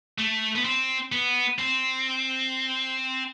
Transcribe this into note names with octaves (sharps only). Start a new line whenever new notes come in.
A3
B3
C4
B3
C4